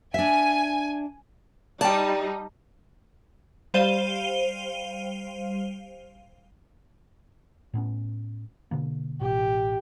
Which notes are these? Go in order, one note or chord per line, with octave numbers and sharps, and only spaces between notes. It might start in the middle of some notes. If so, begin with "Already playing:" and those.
D4 E5 G#5
G3 D#4 D5 G5 A5
G3 C5 F5 D#7 G7
A2 B3 C#4
B2 D3 A#3
A1 B2 G4